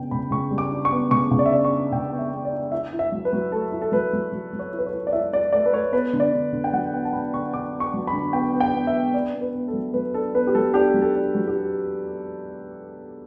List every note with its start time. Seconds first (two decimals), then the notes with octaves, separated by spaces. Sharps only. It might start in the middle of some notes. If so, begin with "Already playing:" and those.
Already playing: C#3 B3 D4 G5
0.11 C#3 B5
0.31 C#3 C#6
0.51 G3
0.58 D6
0.71 D4
0.85 C#6
0.92 B3
1.11 C#3 C#6
1.31 C#3
1.39 D5
1.46 E5
1.51 D4 D5
1.65 C#6
1.72 D4
1.92 C#3 G5
2.12 B3
2.19 E5
2.32 B3
2.45 D5
2.53 D4
2.72 E4 E5
2.93 E4
2.99 E5
3.12 F#3
3.25 B4
3.33 F#3
3.52 A3 A4
3.72 E4
3.82 A4
3.92 F#3 B4
4.13 F#3
4.32 F#3
4.53 F#3
4.59 C#5
4.72 E4
4.78 B4
4.86 C#5
4.93 E4
5.07 D5
5.13 E4 E5
5.33 E4 D5
5.53 A3 D5
5.66 B4
5.73 A3 C#5
5.92 B3 B4
6.13 D3
6.20 D5
6.33 D3
6.53 D3
6.64 G5
6.73 F#3 F#5
6.93 B3 G5
7.05 A5
7.13 D3 B5
7.34 D3 C#6
7.53 D3 D6
7.73 B3
7.80 C#6
7.94 F#3
8.07 B5
8.13 D3
8.33 B3 G5
8.54 B3
8.60 G5
8.74 B3
8.87 E5
8.93 B3
9.14 D4 D5
9.34 B3
9.41 B4
9.55 B3
9.68 A4
9.73 F#3
9.94 F#3 B4
10.14 D4 A4
10.34 B3 B4
10.47 G4
10.55 F#3 A4
10.74 D4 G4
10.94 F#3
11.02 A4
11.15 D4
11.35 F#3
11.48 G4